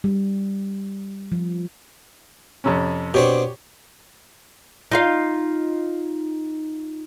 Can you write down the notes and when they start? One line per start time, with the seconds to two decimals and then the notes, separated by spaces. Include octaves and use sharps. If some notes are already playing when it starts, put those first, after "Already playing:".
0.04 G3
1.32 F3
2.64 F2 C3 C#4
3.14 B2 C4 D4 G4 C#5
4.91 D#4 F4 F5